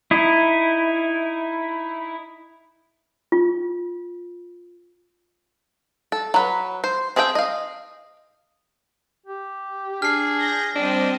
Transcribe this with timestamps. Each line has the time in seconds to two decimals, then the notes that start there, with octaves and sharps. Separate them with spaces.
0.11 D#4 E4
3.32 F4
6.12 A4
6.34 F#3 B4
6.84 C5
7.16 C4 G#4 A4 E5 G5
7.35 D#5 F5
9.26 G4
10.02 D4 G#4 F6 C7
10.41 G6 A#6
10.76 G3 C4 D4 D#5